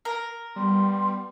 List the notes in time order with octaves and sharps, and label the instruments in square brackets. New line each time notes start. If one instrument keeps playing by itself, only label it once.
[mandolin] A#4
[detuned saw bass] G3 [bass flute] B3 [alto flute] C6